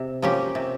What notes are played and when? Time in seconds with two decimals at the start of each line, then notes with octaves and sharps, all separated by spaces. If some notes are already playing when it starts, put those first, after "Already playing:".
Already playing: C3
0.22 F3 A#3 C#4 G4
0.55 C3